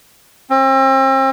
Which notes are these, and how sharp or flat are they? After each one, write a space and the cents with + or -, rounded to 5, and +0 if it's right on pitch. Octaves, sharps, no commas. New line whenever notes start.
C4 +40